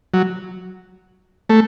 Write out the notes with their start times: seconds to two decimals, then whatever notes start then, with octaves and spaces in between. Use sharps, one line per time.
0.14 F#3
1.50 A3